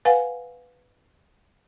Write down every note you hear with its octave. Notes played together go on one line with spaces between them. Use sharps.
B4 F5 F#5 G#5